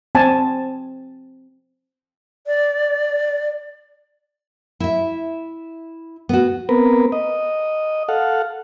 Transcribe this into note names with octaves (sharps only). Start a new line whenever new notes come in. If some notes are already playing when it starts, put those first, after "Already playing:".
C4 G#5 A5
D5
E4 E5
B3 F#4
B3 C4 A#4 B4
D#5
A4 F5 F#5